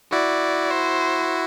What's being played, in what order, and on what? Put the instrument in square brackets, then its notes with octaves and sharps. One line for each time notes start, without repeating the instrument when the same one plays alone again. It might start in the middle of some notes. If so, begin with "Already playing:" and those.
[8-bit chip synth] E4 F#4 [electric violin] D5
[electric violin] C5